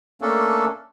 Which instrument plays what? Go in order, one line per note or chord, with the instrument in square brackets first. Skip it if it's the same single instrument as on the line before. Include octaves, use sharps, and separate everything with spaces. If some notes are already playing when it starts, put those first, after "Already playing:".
[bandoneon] A3 A#3 C#4 D4 A4